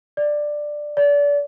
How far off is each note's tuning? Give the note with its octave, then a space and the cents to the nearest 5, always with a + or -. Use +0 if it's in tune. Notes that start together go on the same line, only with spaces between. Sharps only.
D5 +10
D5 -30